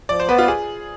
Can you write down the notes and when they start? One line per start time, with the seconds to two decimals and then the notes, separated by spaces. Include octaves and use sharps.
0.09 F3 D5
0.20 C5
0.29 B3 B4
0.38 F4
0.48 G#4